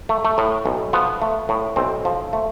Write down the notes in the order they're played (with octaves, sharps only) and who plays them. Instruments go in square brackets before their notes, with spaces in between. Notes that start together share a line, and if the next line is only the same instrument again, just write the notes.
[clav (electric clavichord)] A3
A3
A2
B1
F3 B3
A3
A2
B1 C4
F3
A3